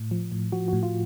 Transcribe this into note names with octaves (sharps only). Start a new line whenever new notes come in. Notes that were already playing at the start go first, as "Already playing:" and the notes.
Already playing: A2
F3
A2
F3 F#4
A2 F#4
F4